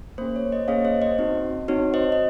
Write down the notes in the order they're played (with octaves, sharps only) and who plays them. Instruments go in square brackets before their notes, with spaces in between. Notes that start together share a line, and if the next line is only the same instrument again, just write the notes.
[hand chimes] A#3 C#4 G#4 C5
C#5
C5 D#5
A#3 C#4 G#4 C#5 F5
C5 D#5
C5 D#5
C4 D#4 F#4
C4 D#4 F#4 C#5
C5 D#5
D#5